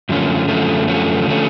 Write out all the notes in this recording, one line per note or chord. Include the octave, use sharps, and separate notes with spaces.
F#2 D3 F3 A3 C#4
F#2 D3 F3 A3 C#4
F#2 D3 F3 A3 C#4
D3 F3 A3 C#4